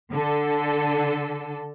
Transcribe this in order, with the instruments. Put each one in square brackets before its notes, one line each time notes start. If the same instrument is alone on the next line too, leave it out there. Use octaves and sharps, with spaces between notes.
[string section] D3 A4